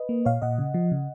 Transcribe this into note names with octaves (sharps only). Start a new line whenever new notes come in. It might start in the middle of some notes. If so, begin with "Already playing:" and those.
Already playing: B4 D#5
A#3
A#2 C#5 F5
A#2 D#5 F#5
C#3
F3
C#3